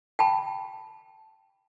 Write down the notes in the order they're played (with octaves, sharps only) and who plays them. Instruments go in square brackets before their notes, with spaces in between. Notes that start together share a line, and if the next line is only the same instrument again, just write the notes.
[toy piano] G5 A5 B5